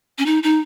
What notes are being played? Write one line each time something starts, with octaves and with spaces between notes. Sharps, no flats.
C#4
D#4
D#4